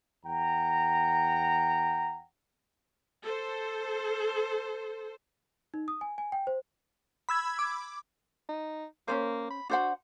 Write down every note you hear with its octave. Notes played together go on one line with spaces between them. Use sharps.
E2 F#5 G5 A#5
A4 C5
D#4
D#6
G#5
G#5
G5
C5
B5 E6 G#6
D6
D#4
A#3 C#4 D4 C5
B5
D4 F#4 C5 F#5